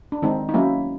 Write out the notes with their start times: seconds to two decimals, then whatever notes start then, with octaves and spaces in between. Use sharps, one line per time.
0.12 D4
0.22 D#3 G#3 C4 D#4
0.49 D#4
0.54 F#3 A#3 C#4 E4